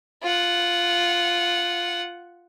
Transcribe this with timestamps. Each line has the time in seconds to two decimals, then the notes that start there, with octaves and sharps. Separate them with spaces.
0.23 F4 F#5